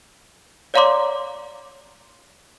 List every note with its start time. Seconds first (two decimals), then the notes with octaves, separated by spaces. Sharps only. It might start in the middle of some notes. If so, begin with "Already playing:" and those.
0.74 C#5 D5 F5 A#5 C6 D6